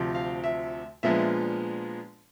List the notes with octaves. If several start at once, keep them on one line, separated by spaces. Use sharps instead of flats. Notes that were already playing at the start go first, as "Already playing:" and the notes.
Already playing: D2 C3 F3
F5
E5
A#2 F3 G#3 B3 D4 E5